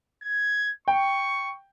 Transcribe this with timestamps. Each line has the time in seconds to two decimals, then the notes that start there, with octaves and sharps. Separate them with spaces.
0.23 G#6
0.88 G5 C#6